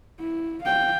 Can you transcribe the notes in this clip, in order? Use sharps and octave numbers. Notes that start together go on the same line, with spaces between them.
E4
F5 G5